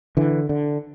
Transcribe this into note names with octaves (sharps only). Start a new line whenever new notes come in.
D3 E3
D3